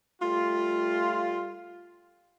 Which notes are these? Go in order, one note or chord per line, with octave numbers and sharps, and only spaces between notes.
G3 A3 F4